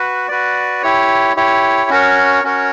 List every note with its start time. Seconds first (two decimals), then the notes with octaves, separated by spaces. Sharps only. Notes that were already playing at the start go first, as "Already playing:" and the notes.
Already playing: F#4 B4
0.28 F#4 B4 D5
0.83 E4 G4 C#5
1.36 E4 G4 C#5
1.90 C#4 F#4 A#4 C#5
2.44 C#4 F#4 A#4 C#5